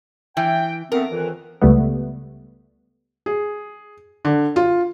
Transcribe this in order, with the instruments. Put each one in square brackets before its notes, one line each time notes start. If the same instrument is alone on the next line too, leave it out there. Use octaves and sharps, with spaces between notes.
[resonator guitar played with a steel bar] E3 [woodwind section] G5
[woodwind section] A3 B3 C4 [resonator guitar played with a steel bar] A#4
[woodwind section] F2 D#3 E3
[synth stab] C#2 G3 A3 B3
[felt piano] G#4
D3
F4